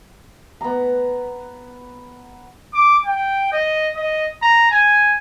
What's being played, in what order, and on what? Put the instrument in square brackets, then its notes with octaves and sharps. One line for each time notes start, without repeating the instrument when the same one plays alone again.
[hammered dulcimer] B3 A#5
[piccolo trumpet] D6
G5
D#5
D#5
A#5
G#5